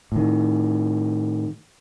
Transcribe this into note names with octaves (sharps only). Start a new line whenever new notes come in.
A2 D#3